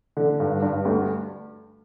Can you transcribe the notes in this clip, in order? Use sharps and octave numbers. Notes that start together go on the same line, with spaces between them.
D3
G2
G2
D2